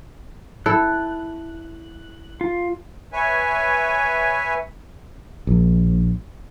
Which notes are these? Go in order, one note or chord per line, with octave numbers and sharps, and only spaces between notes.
E4 A4 F#6
F4
B4 C#5 E5 G#5
A#1